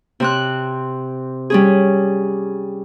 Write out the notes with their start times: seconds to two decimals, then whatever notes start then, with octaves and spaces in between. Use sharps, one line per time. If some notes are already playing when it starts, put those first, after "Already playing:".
0.20 C3 C4 F#6
1.50 G3 C#4 G#4